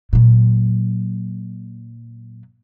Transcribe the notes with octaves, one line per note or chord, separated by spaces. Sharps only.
A#2 F#3